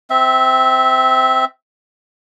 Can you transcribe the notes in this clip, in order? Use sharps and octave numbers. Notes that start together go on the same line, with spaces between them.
C4 E5